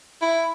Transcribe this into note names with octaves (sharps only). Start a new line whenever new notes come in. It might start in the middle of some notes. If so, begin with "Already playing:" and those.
E4